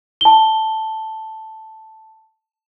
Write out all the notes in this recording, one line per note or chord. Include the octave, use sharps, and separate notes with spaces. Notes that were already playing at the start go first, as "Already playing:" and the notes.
A5 G7